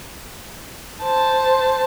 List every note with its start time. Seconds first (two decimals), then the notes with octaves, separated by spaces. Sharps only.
1.03 C5 A5